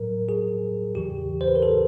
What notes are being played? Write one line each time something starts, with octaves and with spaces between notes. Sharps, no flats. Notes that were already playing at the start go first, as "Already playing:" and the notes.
Already playing: A2 F#3 A#4
G#4
E2 C#3 E3 G4
C5
B4
A#4
A4